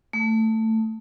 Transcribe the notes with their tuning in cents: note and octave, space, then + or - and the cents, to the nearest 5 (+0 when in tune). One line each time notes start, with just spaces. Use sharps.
A3 +15